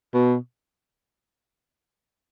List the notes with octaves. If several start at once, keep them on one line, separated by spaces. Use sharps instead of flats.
B2